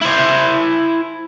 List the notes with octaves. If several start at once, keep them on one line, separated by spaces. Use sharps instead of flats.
E4 C5